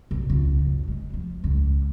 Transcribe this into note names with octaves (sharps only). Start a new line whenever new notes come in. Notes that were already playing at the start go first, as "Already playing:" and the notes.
B1
C#2
F#2
G#3
F3
C#2